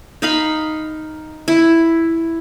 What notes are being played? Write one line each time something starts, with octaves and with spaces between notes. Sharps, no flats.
D#4 F5 B5
E4